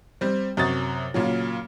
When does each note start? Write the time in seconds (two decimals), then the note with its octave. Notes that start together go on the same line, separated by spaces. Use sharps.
0.21 G3 C4
0.57 F#2 C3 F#4 C#5 D#6 A6
1.14 A#2 C#3 F#3